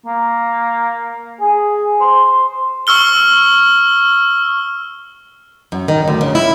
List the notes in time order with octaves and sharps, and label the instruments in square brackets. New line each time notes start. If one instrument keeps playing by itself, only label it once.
[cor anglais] A#3
G#4
C5
[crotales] C#6 E6 F6 G7
[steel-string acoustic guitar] F#2
D#3
D2
C#3
E4